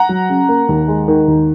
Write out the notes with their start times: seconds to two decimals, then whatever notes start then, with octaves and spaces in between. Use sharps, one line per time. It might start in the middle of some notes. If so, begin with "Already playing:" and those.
Already playing: F#5 A#5
0.09 F#3
0.29 C#3
0.49 A#3
0.69 D#2
0.88 G#3
1.08 D#3
1.28 D#2